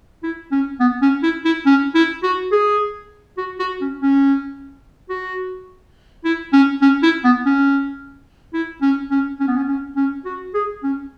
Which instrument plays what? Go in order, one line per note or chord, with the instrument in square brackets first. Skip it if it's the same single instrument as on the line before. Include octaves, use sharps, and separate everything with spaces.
[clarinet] E4
C#4
B3
C#4
E4
E4
C#4
E4
F#4
G#4
F#4
F#4
C#4
C#4
F#4
E4
C#4
C#4
E4
B3
C#4
E4
C#4
C#4
C#4
B3
C#4
C#4
C#4
F#4
G#4
C#4